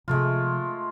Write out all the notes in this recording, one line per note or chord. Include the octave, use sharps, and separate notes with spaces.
C3 F3 G#3 A3 F4